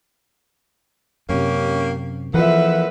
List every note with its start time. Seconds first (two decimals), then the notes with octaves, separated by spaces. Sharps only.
1.29 F#2 C3 A#3 C#4 G4
2.34 F2 A#2 E3 F3 B4 E5 F#5